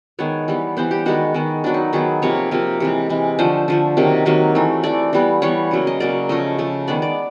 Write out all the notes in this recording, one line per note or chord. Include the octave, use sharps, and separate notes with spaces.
D#3 G#3 B3 C#5
E3 G3 B3
E3 G3 B3 C5
G4
D#3 G#3 B3 F#4
D#3 G#3 B3
D#3 F#3 B3 D4
D#4
D#3 F#3 B3 G#4
C3 F3 A#3 C#5
C3 F3 A#3
C3 E3 G#3
C3 E3 G#3
D3 F3 A3 C5
D3 F3 A3
C3 D#3 F#3 A#3
C3 D#3 F#3 A#3
E3 A3
E3 A3 D5
E3 G3 B3
E3 G3 B3 C#5
C#3 F#3 A#3
D#5
C#3 F#3 A#3 D5
C#3 F3 A3 D#5
C#3 F3 A3
D#3 G#3 B3 D5
D5